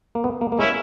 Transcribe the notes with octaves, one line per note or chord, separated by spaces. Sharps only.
A#3
B3
A#3
A#3
G#3 C#4 E4